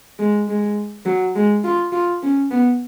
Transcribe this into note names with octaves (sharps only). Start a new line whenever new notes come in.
G#3
G#3
F#3
G#3
F4
F4
C#4
B3